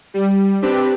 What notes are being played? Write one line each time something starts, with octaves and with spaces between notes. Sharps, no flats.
G3
C4 D4 G4 B4